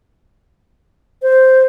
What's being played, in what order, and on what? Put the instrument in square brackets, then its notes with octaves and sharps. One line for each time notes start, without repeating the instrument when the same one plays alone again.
[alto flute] C5